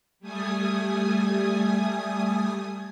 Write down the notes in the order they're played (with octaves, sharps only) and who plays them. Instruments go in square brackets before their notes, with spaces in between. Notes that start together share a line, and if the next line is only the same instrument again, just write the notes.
[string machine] G3 A3 G#5 D#6